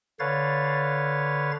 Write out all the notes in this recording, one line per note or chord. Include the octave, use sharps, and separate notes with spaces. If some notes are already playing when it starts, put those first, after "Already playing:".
D3 B4 C#5 F5 A6